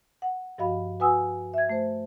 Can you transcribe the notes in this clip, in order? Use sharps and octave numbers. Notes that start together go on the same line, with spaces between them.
F#5
G2 F3 F#4 D#5 F5 B5
F#4 B4 F#5 G#5 D#6 E6
E5 G#6
A3 C5